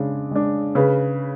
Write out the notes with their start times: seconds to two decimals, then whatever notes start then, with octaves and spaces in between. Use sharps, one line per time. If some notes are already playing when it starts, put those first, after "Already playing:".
Already playing: C#3 G#3 D4
0.31 G#3 D4
0.75 C#3 B4